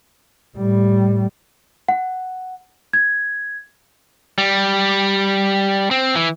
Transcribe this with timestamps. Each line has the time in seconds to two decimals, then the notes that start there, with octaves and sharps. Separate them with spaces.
0.57 A2 G3
1.88 F#5
2.93 G#6
4.38 G3
5.91 C4
6.16 E3